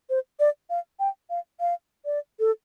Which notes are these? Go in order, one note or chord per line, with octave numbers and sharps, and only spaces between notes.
C5
D5
F5
G5
F5
F5
D5
A4